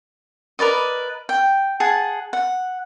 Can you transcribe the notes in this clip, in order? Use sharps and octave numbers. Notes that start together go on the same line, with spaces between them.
A#4 B4 D5 D#5
G5
G#4 F#5 A5
F#5